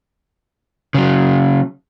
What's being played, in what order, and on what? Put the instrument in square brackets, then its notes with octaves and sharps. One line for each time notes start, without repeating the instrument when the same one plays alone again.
[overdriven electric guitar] C#3 F#3